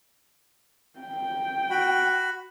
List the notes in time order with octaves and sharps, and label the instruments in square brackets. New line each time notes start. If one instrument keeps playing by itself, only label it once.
[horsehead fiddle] G5
[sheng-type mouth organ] F#4 B5